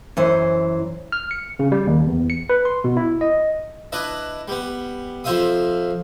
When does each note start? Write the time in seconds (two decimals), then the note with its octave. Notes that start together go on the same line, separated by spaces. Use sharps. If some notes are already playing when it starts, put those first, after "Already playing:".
0.17 F#2 E3 C5
1.12 F6
1.31 C#7
1.59 C#3
1.72 G3
1.87 D#2
2.07 E2
2.30 C#7
2.50 B4
2.65 C6
2.84 B2
2.97 E4
3.21 D#5
3.92 D4 E4 B4 D#5
4.48 G3 B3
5.24 F2 F3 C5 E5 F5 D#6